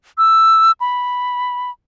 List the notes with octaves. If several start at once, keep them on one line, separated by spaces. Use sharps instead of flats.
E6
B5